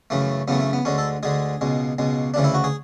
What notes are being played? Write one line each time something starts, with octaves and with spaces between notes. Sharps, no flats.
F#2 C#3 E3 A3
F#2 C#3 E3 A3 B3
A3
B3
D2 D3 G#3 C#4
A4
D2 D3 G#3 G#4
C#2 B2 G#3
C#2 B2 G#3
D2 C#3 E3 D4
E4
F#4
G#4